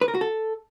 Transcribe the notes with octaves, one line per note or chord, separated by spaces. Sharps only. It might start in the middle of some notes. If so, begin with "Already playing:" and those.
B4
A#4
F#4
A4